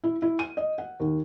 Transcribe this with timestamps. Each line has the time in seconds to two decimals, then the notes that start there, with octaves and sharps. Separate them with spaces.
0.04 E4
0.22 E4
0.39 D#7
0.57 D#5
0.78 F#5
1.00 D#2